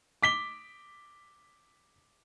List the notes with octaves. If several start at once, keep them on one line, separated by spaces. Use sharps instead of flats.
D6 B6 G7